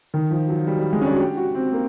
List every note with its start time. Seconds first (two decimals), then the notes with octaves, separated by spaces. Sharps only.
0.14 D#3
0.31 F3
0.49 F#3
0.67 G3
0.79 G3
0.93 G#3
1.01 C#4
1.06 D4
1.13 F#4
1.20 G4
1.37 F#4
1.55 C4
1.72 A#3